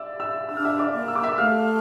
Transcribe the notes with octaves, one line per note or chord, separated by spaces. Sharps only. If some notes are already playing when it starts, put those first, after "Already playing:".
Already playing: D5 E5 E6
E5 E6
D4 E6
F6
E5 E6
D5 D6
A#3
E6
D6
E5 E6
A3 F5 F6